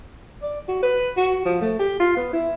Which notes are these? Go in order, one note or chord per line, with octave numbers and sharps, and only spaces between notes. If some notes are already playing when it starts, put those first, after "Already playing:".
D5
F#4
B4
F#4
F3
A3
G4
F4
B3
E4